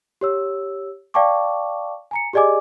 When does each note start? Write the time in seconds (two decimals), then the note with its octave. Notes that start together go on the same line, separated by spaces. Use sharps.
0.21 G4 C#5 E6
1.14 D5 F5 G5 A5 C#6 D6
2.11 G#5 A#5 C#7
2.33 G4 G#4 D5 D#5 G#5 D6